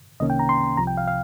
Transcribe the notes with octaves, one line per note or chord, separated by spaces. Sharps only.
C2 C3 D#3 A#3 C#4 D#5
G5
A#5
C6
C2 C3 F3 A#5
G5
F5
F5